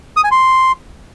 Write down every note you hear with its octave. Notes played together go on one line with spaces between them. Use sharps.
D#6
G#5
C6